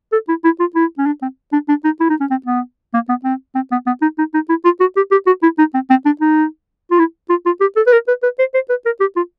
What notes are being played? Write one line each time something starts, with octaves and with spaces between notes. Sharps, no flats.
A4
E4
E4
F4
E4
C#4
D4
C4
D4
D4
D#4
E4
D#4
C#4
C4
B3
A#3
B3
C4
C4
B3
B3
D#4
D#4
D#4
E4
F4
F#4
G4
G4
F#4
E4
D#4
C4
C4
D4
D#4
F4
E4
F4
F4
G4
A4
B4
A#4
B4
B4
C5
C5
B4
A#4
G4
F4